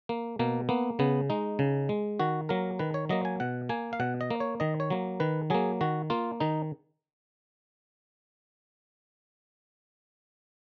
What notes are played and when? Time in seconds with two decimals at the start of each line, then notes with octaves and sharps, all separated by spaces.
0.09 A#3
0.39 B2 A#3
0.69 A#3 B3
0.99 C#3 B3
1.30 G#3 D#4
1.59 C#3
1.89 G#3
2.20 D#3 F#4
2.49 F#3 A#3 A#4
2.79 D#3 B4
2.94 C#5
3.09 F#3 A#3 D#5
3.25 G#5
3.40 B2 F#5
3.69 A#3 G#5
3.93 F5
4.00 B2 F#5
4.21 D#5
4.31 A#3
4.40 C#5
4.60 D#3 D#5
4.80 C#5
4.90 F#3 A#3
5.20 D#3 B4
5.50 F#3 A#3 G#4
5.81 D#3 F#4
6.10 A#3 F4
6.40 D#3 D#4